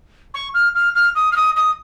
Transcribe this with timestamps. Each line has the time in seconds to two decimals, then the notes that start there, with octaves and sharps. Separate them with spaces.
0.34 C#6
0.54 F6
0.75 F6
0.95 F6
1.15 D#6
1.32 F6
1.36 D#6
1.56 D#6